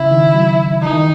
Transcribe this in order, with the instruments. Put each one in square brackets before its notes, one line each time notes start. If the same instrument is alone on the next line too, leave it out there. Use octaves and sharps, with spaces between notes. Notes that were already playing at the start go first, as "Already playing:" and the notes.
Already playing: [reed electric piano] C#3 [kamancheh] E4
[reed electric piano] D#3
F#3
[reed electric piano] E3 [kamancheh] D#4
[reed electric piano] D#3